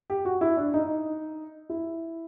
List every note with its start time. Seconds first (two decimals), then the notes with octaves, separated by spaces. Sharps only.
0.10 G4
0.25 F#4
0.41 E4
0.57 D4
0.74 D#4
1.69 E4